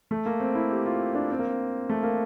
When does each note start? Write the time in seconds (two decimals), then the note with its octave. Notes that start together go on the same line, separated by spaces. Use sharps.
0.11 A3
0.26 A#3
0.40 C4
0.55 E4
0.71 G4
0.86 F4
1.15 D4
1.30 C4
1.39 A#3
1.48 C4
1.89 A3
2.03 A#3